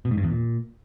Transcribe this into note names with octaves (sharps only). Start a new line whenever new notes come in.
B2
G#2
G2
E2
A#2